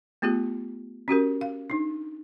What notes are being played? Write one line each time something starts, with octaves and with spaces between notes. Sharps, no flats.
A3 B3 F4 G4 G#4
C#4 F#4 G4 A#4
F5
D4 D#4